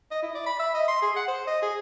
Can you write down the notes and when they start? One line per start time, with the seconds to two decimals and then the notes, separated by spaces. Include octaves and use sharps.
0.11 D#5
0.23 E4
0.35 D5
0.46 B5
0.60 E5
0.74 D#5
0.88 C6
1.02 G#4
1.16 F#5
1.28 C5
1.47 D#5
1.62 G#4